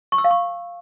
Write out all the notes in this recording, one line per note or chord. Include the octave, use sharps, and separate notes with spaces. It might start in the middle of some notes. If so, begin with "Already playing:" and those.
C#6
E6
F5
C#6